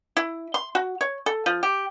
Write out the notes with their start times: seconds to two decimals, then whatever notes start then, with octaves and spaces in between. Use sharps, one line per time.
0.17 E4
0.54 C6
0.75 F#4
1.01 C#5
1.26 A4
1.46 F3
1.63 G4